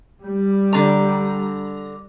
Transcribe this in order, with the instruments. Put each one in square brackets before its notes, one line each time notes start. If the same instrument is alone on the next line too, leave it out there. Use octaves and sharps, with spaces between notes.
[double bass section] G3
[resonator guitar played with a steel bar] D3 A#5